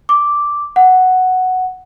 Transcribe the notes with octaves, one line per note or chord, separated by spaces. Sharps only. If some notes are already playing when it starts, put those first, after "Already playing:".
D6
F#5